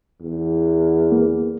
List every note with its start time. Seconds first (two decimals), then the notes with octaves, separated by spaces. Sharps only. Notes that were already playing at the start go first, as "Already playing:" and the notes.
0.21 E2
1.12 A#3